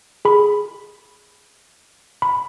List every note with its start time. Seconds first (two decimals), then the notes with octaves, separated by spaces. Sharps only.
0.25 G#4 B5
2.22 B5